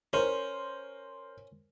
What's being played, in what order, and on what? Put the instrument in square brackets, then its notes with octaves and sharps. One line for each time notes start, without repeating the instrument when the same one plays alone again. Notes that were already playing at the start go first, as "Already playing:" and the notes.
[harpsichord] C#4 [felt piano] A#4 C5 C6